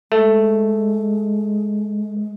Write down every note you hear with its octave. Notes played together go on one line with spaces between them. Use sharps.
G#3 A3